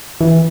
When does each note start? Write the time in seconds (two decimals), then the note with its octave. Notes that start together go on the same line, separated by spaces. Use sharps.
0.21 E3